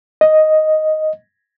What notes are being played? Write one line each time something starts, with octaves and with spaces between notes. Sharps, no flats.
D#5